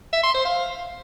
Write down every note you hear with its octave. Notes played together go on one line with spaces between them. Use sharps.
E5
C6
C5
F5